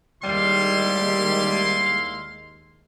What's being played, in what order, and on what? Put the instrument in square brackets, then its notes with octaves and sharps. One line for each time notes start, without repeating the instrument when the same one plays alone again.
[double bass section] D#2 G#3 [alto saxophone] G3 [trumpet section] E4 F5 C6